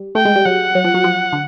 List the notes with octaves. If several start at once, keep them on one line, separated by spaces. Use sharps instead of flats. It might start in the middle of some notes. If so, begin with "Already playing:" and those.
Already playing: G3
A3 G5
G#3
G3
F#3 F#5
F#3
F3
F#3
F3
D3